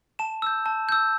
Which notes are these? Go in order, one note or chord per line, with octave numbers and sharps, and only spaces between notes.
A5 E7
E6 G6
A5
E6 G6